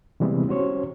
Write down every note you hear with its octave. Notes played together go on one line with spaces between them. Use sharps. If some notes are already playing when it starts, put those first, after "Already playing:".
C3 E3 G3 G#3 B3 C4
C#4 F#4 C5 C#5